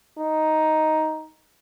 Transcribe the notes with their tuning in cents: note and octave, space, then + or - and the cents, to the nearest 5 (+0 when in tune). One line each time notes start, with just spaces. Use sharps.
D#4 +5